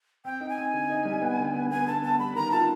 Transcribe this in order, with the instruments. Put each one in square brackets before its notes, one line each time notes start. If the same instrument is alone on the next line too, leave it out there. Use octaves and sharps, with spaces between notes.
[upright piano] C4 [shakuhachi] G5
[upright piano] D#4
[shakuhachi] G#5
[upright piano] C4
D3
D#4
G3
B3
D3
B3
[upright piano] B3 [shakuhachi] G#5
[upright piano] D3 [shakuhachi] A5
[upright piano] B3 [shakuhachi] A5
[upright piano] G3 [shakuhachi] B5
[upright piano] D#3 [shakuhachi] A#5
[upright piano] F4 [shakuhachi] A5